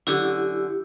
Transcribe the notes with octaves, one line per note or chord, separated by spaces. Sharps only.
F#2 D3 E4 G4